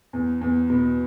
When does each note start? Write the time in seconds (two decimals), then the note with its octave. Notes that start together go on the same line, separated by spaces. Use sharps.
0.13 E2
0.41 E2
0.70 B2